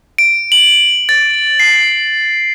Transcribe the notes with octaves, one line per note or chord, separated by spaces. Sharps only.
D7
F#7
A6
C7